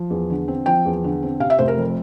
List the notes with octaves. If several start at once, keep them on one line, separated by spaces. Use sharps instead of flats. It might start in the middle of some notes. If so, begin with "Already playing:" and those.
Already playing: F3
E2
D3
C4
F3 G5
E2
D3
C4
C3 F5
E5
F1 C5
A#4
F2